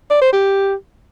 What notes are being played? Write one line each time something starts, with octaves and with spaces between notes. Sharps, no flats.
D5
C5
G4